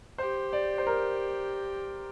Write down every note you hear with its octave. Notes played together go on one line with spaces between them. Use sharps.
G4 C5
D5
C5
A#4